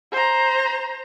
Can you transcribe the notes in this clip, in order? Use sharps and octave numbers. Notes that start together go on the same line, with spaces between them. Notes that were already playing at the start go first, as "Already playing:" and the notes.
C5 A#5